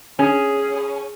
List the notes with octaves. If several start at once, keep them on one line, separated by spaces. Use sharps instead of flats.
C#4 G#4